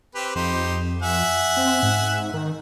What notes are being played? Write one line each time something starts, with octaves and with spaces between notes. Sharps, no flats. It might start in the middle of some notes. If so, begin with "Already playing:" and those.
C4 G4 B4
F2 D#4 G4 C5
E5 F#5 G#5
C4
G#2
D#3